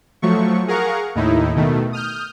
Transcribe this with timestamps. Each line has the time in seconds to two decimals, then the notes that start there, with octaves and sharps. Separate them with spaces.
0.22 F3 F#3 A3 C#6
0.68 G#4 A#4 F5 F#5 A#5 C#6
1.15 D#2 A2 D#4 E4
1.56 B2 D#3 A3
1.93 D#6 F6 G6